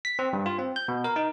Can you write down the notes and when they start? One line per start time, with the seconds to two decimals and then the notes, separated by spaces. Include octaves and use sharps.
0.05 B6
0.19 C4
0.33 G2
0.46 F4
0.58 C4
0.76 G6
0.88 B2
1.04 A#4
1.16 D#4